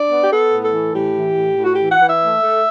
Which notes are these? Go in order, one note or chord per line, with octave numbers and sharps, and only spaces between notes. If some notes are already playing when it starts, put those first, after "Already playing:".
Already playing: D4 D5
B3
G4
B3 A4
A2
A4
E3
A2 G4
E3
A2
A2 F#4
G4
E3
F#5
E3
E5
A3
A3